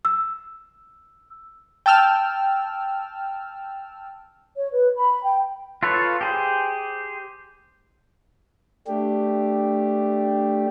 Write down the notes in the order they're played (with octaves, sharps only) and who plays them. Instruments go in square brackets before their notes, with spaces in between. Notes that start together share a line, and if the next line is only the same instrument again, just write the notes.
[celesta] E6
[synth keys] G5 A5 E6 F6
[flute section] C#5
B4
B5
G5
[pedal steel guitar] F4 A4 B4 C#5
G4 G#4 C5
[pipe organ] A3 D4 G4